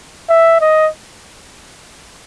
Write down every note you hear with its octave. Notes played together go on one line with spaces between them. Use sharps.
E5
D#5